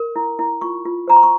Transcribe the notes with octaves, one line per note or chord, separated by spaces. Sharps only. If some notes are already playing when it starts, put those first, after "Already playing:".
Already playing: A#4
E4
E4
F4 C#6
F4
C5 A#5
C6
C#6